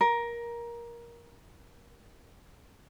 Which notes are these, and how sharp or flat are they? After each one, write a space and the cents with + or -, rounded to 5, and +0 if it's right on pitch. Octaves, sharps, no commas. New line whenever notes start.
A#4 +15